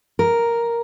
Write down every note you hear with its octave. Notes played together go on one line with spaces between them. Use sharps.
A#4